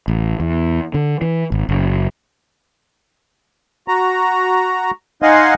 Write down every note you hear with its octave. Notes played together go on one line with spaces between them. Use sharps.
A1
E2
D3
E3
G#1
F#1
F#4 A#5
D#4 D#5 F5 F#5 G#5 C6